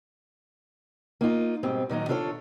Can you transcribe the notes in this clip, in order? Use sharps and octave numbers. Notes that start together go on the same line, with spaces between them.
A#3 D#4 F4
G#2 B2 G3 C4
A#2 D#3 F#3 D#4
D4 F4 A4 B4 C#5